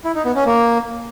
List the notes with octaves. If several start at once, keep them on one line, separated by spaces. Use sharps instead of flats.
E4
D#4
B3
C#4
A#3